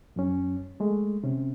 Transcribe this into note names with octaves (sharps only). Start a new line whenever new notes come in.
F#2 F#3 C#4
G#3 A3
C3 C#4